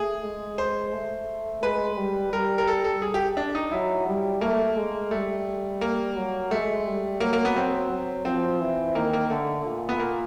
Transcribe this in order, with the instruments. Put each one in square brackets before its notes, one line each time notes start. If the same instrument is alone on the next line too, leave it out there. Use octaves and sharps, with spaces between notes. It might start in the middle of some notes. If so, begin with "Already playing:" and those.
Already playing: [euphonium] A3 [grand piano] G#4
[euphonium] G#3
[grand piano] C5
[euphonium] A3
[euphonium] G#3 [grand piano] B4
[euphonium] G3
[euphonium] G3 [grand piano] A#4
[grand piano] A#4
A4
A4
G#4
G4
D4
D#4
[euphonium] F#3 [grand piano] E4
[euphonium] G3
[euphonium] A3 [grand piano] A#3
[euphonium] G#3
[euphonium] G3 [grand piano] A3
[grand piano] A#3
[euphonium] F#3
[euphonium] G#3 [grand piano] A3
[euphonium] G3
[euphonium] F#3 [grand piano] A#3
[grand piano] A#3
B3
[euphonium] F#3 [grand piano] C4
[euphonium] F#3
[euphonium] F3 [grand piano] C4
[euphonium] E3
[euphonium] D#3 [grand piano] A#3
[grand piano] A#3
[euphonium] D3 [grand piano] A3
[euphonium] A#2
[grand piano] B3
A#3